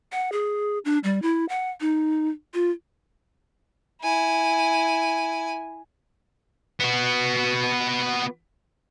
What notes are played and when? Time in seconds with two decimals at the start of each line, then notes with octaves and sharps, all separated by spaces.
0.12 F#5
0.32 G#4
0.85 D4
1.04 G3
1.22 E4
1.49 F#5
1.81 D#4
2.54 F4
4.02 E4 G#5
6.80 B3 F#4